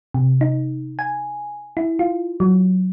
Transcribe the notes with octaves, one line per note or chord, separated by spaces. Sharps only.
C3
D#4
G#5
E4
F4
F#3